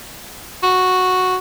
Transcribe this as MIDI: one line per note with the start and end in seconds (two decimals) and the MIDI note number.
0.63 1.37 66